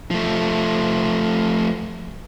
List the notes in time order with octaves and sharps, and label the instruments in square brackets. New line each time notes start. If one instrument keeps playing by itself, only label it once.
[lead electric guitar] F3 A3